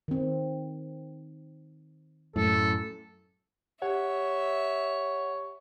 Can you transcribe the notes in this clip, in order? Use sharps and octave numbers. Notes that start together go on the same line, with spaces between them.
D#3 C4
F#2 A2 A4
G4 C#5 E5 F#5